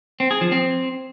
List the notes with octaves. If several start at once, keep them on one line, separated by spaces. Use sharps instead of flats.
C4
G#4
F3
C4